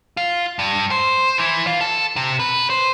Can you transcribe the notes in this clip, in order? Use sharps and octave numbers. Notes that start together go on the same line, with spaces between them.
F4
G2
C5
E3
F4
A4
C3
B4
C5